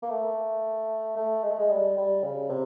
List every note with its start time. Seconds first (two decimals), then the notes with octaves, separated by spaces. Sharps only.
0.03 A#3
0.10 A3
1.16 A3
1.44 G#3
1.51 A3
1.59 G#3
1.71 G3
1.98 G3
2.23 C#3
2.50 C3